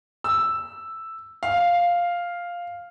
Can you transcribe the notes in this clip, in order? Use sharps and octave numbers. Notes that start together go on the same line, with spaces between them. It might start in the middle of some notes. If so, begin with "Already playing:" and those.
E6
F5